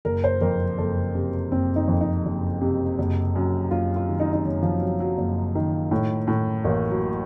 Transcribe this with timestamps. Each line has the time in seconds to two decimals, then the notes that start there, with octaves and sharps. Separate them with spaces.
0.05 F#1 A#4
0.24 C5
0.41 F2 A#4
0.78 F#1 A4
1.15 C3
1.52 F#1 C4
1.76 D#4
1.88 F2
2.01 D#4
2.25 F#1
2.61 C3
2.98 F#1
3.35 F#2
3.71 F#1 F4
3.96 F4
4.08 D#3
4.20 D#4
4.33 D#4
4.44 F#1 C#4
4.63 F3
4.81 F#2 F#3
5.00 F#3
5.18 F#1
5.55 D#3
5.91 A2
6.27 A2
6.64 A1 A#3
6.90 F#3